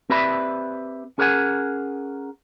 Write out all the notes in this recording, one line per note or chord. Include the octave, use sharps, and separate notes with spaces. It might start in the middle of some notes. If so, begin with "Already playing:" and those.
C4 G4 B4 D5 E5 B5
C#4 G#4 A#4 C5 F#5 G#5